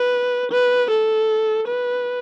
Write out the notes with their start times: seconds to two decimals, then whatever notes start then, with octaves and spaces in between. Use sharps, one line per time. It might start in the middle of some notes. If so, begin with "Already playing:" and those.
Already playing: B4
0.52 B4
0.91 A4
1.68 B4